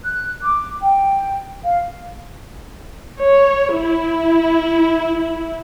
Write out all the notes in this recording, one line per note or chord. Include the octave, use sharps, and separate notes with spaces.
F#6
D6
G5
F5
C#5
E4